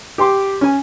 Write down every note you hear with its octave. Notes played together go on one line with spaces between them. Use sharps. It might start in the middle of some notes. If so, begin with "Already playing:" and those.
G4 G5 C6 D6
C#4 G#5